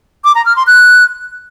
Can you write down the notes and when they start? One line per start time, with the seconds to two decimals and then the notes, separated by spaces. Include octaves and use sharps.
0.24 D6
0.35 A#5
0.46 F6
0.56 C6
0.67 F#6